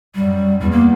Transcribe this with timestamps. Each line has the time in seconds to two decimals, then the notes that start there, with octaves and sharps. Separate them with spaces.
0.15 F#2 G3
0.60 E2 G3
0.71 A#3